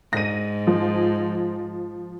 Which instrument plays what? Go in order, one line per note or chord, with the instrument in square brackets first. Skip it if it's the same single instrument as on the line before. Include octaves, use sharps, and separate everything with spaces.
[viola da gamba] G#2 [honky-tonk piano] A#6 D#7
[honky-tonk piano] F3